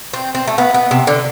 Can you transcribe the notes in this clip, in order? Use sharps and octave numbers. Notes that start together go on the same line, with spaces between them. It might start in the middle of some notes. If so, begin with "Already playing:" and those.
C4
C4
A3
B3
B3
C3
D3